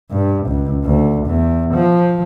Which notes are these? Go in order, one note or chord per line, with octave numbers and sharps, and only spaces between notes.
G2
C#2
D2
E2
F3